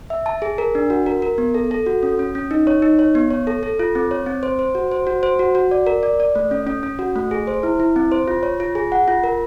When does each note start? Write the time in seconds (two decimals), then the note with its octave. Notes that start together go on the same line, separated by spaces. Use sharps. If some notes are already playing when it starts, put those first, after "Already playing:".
0.10 E5
0.26 A5
0.42 G#4
0.58 A#4
0.75 D4
0.90 F#4
1.06 A#4
1.22 A#4
1.38 B3
1.54 A4
1.71 A4
1.86 F#4
2.03 C#4
2.19 C#4
2.35 C#4
2.51 D#4
2.67 C#5
2.82 D#4
2.99 C#5
3.15 B3
3.30 C#5
3.47 A4
3.63 A4
3.79 F4
3.95 C4
4.11 C#5
4.26 C4
4.43 C5
4.59 C5
4.75 F#4
4.92 C5
5.07 F#4
5.23 C5
5.39 F#4
5.55 F#4
5.71 D5
5.87 A#4
6.03 D5
6.20 D5
6.35 A3
6.51 C#4
6.67 C#4
6.83 C#4
6.99 F#4
7.16 A3
7.31 G#4
7.47 C5
7.63 E4
7.80 E4
7.96 C4
8.12 C5
8.28 F4
8.43 C#5
8.60 F4
8.75 G#4
8.92 F#5
9.08 F4
9.24 A#4